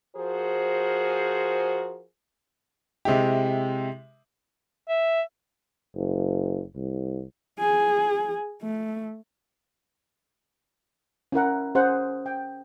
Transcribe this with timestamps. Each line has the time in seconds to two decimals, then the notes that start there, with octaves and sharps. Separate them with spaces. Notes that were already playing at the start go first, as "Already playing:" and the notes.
0.15 F3 F#4 G#4 A#4 C5
3.05 C3 G#3 E4 G4
4.89 E5
5.95 F#1
6.76 C2
7.60 G#4
8.62 A3
11.32 C#4 E4 A#4 F#5
11.75 C#4 G#4 C5 F#5
12.26 G5